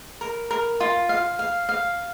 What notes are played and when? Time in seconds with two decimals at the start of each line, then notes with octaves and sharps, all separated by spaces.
0.21 A#4
0.51 A#4
0.80 F4
1.09 F5
1.39 F5
1.69 F5